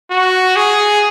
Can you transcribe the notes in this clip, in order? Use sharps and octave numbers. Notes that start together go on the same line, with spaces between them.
F#4
G#4